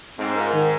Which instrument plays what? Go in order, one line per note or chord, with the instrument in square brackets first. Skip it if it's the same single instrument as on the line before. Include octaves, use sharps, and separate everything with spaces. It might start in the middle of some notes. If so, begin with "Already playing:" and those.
[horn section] G#2 [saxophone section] C4
[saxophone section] F4 A#4
D#3